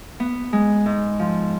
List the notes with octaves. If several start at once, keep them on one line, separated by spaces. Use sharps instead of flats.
B3
G#3
G#2
F3